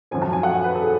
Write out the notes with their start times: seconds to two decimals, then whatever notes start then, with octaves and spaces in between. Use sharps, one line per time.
0.11 G#1 F#2 F3 G#5
0.22 A5
0.33 G#5
0.43 F#5
0.64 B4
0.75 A4
0.83 G#4